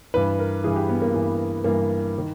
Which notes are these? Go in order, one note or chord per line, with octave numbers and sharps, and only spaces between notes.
G2 E3 B4
A#4
G2 E3 G#4
G4
B3
A#3
G2 E3
G2 E3 A#3
D#3